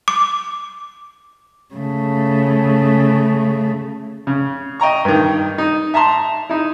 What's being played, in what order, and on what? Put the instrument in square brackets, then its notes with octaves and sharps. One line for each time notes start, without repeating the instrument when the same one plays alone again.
[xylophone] D6
[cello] C#3 A3
[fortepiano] C#3
D#5 G5 A#5 C#6
G2 D#3
D#4
E5 A5 A#5 C6
D#4 E4